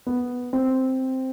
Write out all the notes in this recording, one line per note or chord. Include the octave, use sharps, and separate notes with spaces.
B3
C4